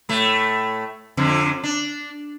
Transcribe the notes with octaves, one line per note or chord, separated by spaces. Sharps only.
A2 A3
F2 D3 F3
D4